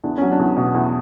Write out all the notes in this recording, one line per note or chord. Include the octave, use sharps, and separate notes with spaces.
E2 D4
F#3 C#4
D4
E2
B2
E2